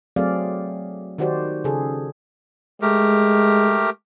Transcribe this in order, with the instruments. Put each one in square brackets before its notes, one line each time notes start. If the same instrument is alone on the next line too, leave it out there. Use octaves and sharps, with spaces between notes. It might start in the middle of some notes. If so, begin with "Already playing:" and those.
[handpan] F#3 A3 C4 G#4 D5 F5
D#3 D#4 F#4 G4 C5 D5
C#3 G#4 A4
[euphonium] G#3 [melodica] A3 G4 A#4